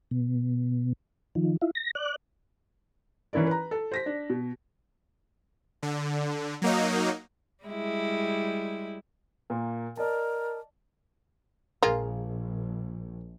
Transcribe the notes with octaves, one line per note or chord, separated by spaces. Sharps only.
B2
D#3 F3
E4 F4
A#6
D5 F#6
E3 C#4 E4 A#4 D5
B4 A#5
A4
C5 A#6 B6
D4
B2
D3
F#3 A#3 D#4
G3 G#3 E4
A#2 A#3
A#4 D5 D#5 A5
A#1 G#3 A#3 F4